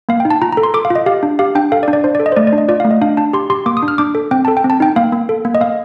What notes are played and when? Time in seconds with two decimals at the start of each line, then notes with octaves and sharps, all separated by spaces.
0.09 A#3 F5
0.20 G5
0.25 D#4
0.30 A5
0.42 F4 A#5
0.52 A4 A#5
0.63 C6
0.74 A4 D6
0.85 F5
0.90 F4
0.95 D#5
1.06 G4 F5
1.23 D4
1.39 G4 F5
1.55 D4 G5
1.72 A4 F5
1.83 D5
1.88 D4
1.93 D5
2.04 D4 C5
2.15 D5
2.20 A4
2.26 D#5
2.32 C5
2.37 A3 D5
2.47 D5
2.53 D4
2.58 D#5
2.68 F4 D5
2.80 F5
2.85 A3
2.91 D#5
3.01 D4 F5
3.17 D4 A5
3.33 G4 C6
3.50 G4 C6
3.66 A#3 D6
3.77 D#6
3.83 D4
3.88 F6
3.98 D4 D6
4.15 A4
4.31 C4 G5
4.45 A4 A5
4.57 G5
4.64 C4
4.70 A5
4.80 D#4 G5
4.96 A#3 F5
5.12 A#3
5.29 A4
5.45 A#3
5.55 D#5
5.61 A#3 F5